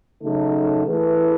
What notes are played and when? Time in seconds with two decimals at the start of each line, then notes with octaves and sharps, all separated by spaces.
0.22 C#3 F#3 A3 D#4 A4
0.86 E3 A3 E4 G#4 B4